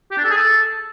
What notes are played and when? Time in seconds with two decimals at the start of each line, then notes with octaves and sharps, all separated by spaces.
0.11 G4
0.18 D4
0.24 A4
0.30 G#4
0.37 A4